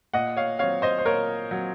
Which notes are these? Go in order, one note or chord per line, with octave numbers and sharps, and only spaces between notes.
A#2 D#5 F#5
C#5 F5
F#3 C4 C#5 F5
C5 D#5
C5
A#2 A#4 C#5
F#3 C4